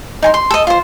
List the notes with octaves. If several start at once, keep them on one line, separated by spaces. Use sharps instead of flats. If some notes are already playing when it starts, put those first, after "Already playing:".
D#4 G#5 C6
C6
A4 D#5
F4 C5